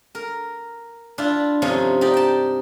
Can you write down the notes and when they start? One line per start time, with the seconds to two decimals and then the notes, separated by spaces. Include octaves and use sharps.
0.15 A#4
1.18 D4 E4 F4
1.62 G2 C3 F3 C#4 D#4
2.01 D#4 G4 D5
2.14 G5 A5